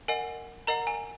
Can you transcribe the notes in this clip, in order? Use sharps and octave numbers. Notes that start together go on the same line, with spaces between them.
A#4 D#5 F#5 G#5
A#4 D#5 F#5 A#5
G#5